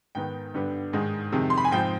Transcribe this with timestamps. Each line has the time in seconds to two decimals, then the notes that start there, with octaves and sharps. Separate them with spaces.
0.15 G#2 D#3 B3 G5
0.54 G2 D3 G3 B3
0.93 G#2 D#3 G#3
1.32 F2 C3 D#3 G#3
1.50 C6
1.58 B5
1.65 G#5
1.72 G#2 F3 C4 G5